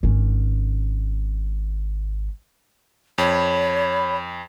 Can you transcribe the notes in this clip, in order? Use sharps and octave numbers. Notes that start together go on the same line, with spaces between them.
G#1 C#4
F2 C#5 B5